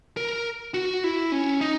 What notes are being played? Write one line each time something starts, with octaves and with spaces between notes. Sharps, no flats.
A#4
F#4
E4
C#4
D#4